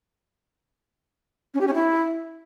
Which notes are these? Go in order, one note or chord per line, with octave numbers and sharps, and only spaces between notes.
C#4
G4
C#4
E4